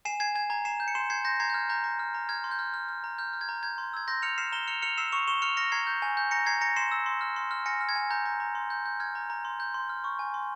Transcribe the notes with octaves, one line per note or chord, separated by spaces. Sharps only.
G#5 C7 E7
G#5 G#6 C7
G#5 G#6
A#5 G#6
A#5 C7 E7
G6
C#7
C6 C7 E7
G6 G#6 C7
C6 G6 A#6
A#5 G#6 C7
G6
F6 G#6
A#5 G6
A#5
F6
A#5
F6 G#6
C6
G6
F6
F6
F6
A#5
F6 G6
F6
G#6
A#5
G6 G#6
C6
E6 G#6
C6 G6 A#6
F6 C#7 F7
F6 C7 E7
A#5 E7 G7
F6 C#7 F7
F6 C#7 F7
E6 C7 E7
C#6 C#7 F7
C#6 E7 G7
F6 C#7 F7
F6 A#6 C#7
A#5 G#6 C7
G6
G#5
G6
A#5 A#6 C#7
A#5 G#6 C7
A#5 A#6 C#7
C6 C7 E7
E6
C6
F6
C6
F6
G#5 A#6 C#7
F6
G#6
G#5
A#5 G6
A#5
A#5
C6
G6
G6
F6 G#6
A#5
A#5
C6
G6
C6
F6
C#6
G#5
C6